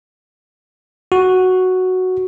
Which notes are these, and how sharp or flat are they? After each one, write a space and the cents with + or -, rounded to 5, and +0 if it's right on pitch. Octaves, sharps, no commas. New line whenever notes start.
F#4 +0